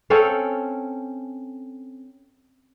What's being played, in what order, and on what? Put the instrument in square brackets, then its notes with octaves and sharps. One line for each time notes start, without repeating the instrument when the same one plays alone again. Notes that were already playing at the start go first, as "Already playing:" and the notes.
[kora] C4 C#4 A4 F5